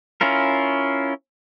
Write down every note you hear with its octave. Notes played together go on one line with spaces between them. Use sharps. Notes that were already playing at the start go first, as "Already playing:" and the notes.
C#4 E4 F4 A#4